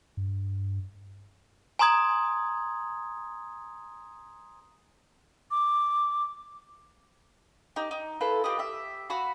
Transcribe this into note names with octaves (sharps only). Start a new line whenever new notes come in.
G2
G#5 A#5 C6 D#6 G#6
D6
D#4 G4
D#4
E4 F4 A4 B4
F4 G4 B4 D#5
G4 E5
F#4 F5 B5